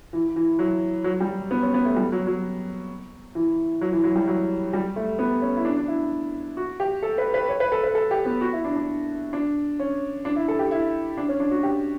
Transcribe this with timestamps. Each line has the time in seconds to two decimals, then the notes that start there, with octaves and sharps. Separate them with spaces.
0.13 E3
0.36 E3
0.59 F#3
1.04 F#3
1.20 G3
1.51 B3
1.62 C#4
1.74 B3
1.85 A3
1.96 G3
2.12 F#3
2.27 F#3
3.35 E3
3.81 F#3
3.92 E3
4.04 F#3
4.16 G3
4.28 F#3
4.73 G3
4.96 A3
5.19 B3
5.42 C#4
5.57 E4
5.65 D4
5.77 D4
5.88 E4
6.57 F#4
6.80 G4
7.03 A4
7.18 B4
7.34 B4
7.49 C#5
7.60 B4
7.72 A4
7.83 B4
7.95 A4
8.11 G4
8.25 B3
8.41 F#4
8.53 E4
8.64 D4
8.75 D4
9.33 D4
9.79 C#4
10.25 D4
10.36 E4
10.48 A4
10.59 G4
10.71 E4
11.17 D4
11.29 C#4
11.40 D4
11.51 F#4
11.63 G4